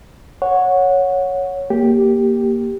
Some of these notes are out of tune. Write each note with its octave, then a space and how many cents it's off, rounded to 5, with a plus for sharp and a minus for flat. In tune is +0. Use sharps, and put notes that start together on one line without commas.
C#5 +0 F#5 -15
A#3 +5 G4 +0